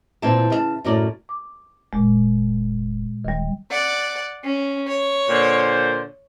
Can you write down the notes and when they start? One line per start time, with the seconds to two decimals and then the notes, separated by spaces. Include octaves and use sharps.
0.22 A#2 E3 C4 E4 A5
0.50 C#3 D#5 A5
0.84 F#2 A2 F#3 A4 A#4 D5
1.29 D6
1.93 F1 A#2 G#3
3.24 D1 D#3 G3
3.71 D5 F#5
4.44 C#4
4.88 C#5
5.27 A#2 D3 C5